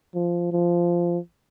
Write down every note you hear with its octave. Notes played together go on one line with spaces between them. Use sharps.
F3
F3